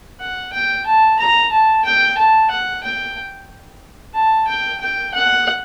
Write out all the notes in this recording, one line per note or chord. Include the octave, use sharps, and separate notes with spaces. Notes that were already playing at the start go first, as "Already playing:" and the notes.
F#5
G5
A5
A#5
A5
G5
A5
F#5
G5
A5
G5
G5
F#5